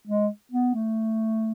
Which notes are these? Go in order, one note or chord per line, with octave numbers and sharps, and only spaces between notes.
G#3
B3
A3